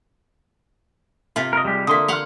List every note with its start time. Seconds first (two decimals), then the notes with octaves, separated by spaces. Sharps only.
1.36 C3 F4
1.53 A#4 D#5
1.65 G3 G#3 G4
1.87 D3 A#3 E5 C6 D#6
2.08 F5 F#5 C6 F6